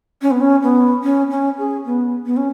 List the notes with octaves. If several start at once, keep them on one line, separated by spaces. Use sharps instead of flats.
C#4
B3
C#4
B3
C#4
C#4
G#4
B3
B3
C#4